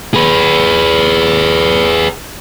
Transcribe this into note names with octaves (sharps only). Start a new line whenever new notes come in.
G#4 B4